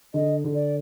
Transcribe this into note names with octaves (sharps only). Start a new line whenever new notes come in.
D3 D#5
D3
D5